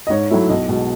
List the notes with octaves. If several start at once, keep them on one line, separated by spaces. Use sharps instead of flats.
D#5
G#2 C#5
F#3 A3 E4
B1 D#5
B2 G#3